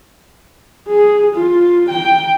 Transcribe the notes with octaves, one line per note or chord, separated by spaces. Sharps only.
G#4
F4
G5